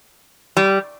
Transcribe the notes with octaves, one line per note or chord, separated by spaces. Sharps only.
G3